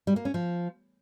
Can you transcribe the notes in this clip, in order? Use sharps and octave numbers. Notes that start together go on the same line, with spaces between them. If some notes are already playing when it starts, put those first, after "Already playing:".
G3
A#3
C#4
F3